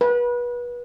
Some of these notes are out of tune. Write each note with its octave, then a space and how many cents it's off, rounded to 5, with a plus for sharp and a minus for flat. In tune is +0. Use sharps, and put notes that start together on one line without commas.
B4 -30